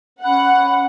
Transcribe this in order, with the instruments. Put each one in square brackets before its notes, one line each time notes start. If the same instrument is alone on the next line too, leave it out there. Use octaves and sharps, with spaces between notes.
[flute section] C#4 B5 F#6 [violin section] F#5